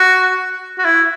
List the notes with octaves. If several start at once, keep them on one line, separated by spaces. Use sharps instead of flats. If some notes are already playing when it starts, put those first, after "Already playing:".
Already playing: F#4
F#4
E4